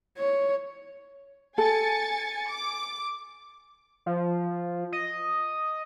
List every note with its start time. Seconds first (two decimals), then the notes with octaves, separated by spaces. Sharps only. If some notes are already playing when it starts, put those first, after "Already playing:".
0.18 C#5
1.58 A4 G#5 A6 C#7
2.48 D6
4.06 F3
4.92 D#5